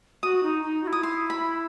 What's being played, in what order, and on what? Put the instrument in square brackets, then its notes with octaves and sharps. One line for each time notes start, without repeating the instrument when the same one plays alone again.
[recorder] F#4 [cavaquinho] D#6
[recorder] D#4
D#4
F#4
E4
[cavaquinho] D#6
C6
B5